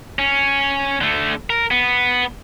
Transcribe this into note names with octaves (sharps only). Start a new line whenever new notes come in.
C#4
D3 A3
A#4
B3